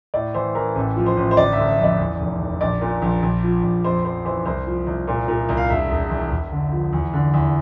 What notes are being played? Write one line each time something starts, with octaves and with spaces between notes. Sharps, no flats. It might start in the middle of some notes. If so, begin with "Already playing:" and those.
A2 D5
E3 C5
E3 A#4
A1 A4
F3
C5
A1
C5
G1 D5
E5
G1
E5
F2
D5
E2
F1
F1
A#1 D5
A#2
A#1
A#1
F3
A#1
F2 C5
F2 C5
E3 C5
C2 C5
F3
C2
A#2
A#2
C2
F5
E1 E5
E1
E2
E1
D3
F3
E2
D3
E2